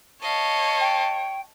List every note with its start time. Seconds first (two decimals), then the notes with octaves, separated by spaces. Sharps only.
0.22 C#5 D#5 F5 A5
0.80 G5